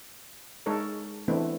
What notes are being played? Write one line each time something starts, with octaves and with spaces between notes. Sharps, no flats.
G#3 D#4 A4 A#4 C#5
E3 A3 B3 C4 D4 E4